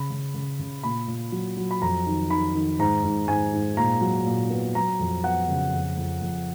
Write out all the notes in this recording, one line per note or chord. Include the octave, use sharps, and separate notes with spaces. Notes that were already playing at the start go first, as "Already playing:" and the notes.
Already playing: C#3 B5
C#3
C#3
C#3
A#2 B5
A#2
F#3
F#3
B5
F2 A#5
D#3
D#3 B5
D#3
G#2 A#5
G#2
G#2 G#5
G#2
A#2 A#5
F#3
A#2
B3
F#3 A#5
F2
B3 F#5
C#3
F2
F2
F2